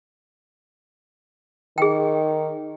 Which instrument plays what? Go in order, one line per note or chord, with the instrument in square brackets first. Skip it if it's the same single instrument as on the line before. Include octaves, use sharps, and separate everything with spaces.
[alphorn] D#3 [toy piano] G#4 G5